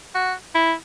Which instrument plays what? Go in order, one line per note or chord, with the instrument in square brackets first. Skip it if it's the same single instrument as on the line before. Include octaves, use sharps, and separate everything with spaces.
[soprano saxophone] F#4
E4